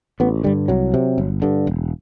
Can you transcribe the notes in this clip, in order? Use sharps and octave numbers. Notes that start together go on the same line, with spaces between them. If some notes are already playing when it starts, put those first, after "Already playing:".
A1 B3
G2 D3 G3
C2 F#3
C3
G1
G2 D3
E1